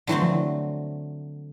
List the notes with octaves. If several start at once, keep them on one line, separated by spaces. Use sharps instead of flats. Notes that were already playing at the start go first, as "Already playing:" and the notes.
D3 E3 F#3 A3 C4
F3
E3